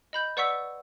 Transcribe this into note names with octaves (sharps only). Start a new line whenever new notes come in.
D#5 B5 G6
B4 D5 F#5 C#6 E6 B6